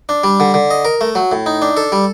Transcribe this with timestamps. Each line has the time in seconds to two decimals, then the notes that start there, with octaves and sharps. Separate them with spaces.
0.09 D4
0.24 G3
0.40 D3
0.54 D3
0.71 D#5
0.85 A#4
1.01 A3
1.15 F#3
1.32 A2
1.46 D#4
1.62 D4
1.77 A4
1.92 G3